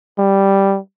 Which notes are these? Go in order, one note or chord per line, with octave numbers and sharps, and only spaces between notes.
G3